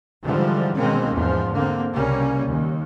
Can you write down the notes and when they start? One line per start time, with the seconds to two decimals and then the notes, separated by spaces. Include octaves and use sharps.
0.24 G#2 D3 E3 F3 G3
0.78 B2 D#3 G#3 A#3 C4 C#4
1.14 E2 G#2 F3
1.55 D3 A#3 C4
1.93 C2 C#3 G3 A#3 C#4
2.49 D#2